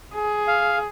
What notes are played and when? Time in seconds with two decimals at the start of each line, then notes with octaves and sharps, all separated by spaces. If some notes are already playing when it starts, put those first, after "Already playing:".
0.15 G#4
0.48 F5